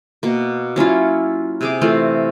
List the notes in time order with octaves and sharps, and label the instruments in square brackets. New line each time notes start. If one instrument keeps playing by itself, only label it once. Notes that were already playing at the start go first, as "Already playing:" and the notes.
[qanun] B2 A#3
F#3 C#4 E4 F4
C3 G#4 D6
E3 A3 F4 C5